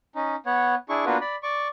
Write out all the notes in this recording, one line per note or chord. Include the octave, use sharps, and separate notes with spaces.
C#4 D#4
B3 C#5 F#5
D4 E4 G#4 C#6
A#3 B3 D4 F4 F#4 B4
D5 B5
D5 C#6 D6